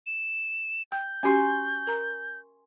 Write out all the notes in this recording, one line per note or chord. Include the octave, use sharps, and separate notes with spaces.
E7
G5 G6
C#4 F#4 G4 G#5 C6 C#6
A#4 A#5